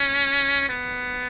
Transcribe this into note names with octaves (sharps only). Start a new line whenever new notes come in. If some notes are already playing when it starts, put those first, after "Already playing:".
Already playing: C#4
B3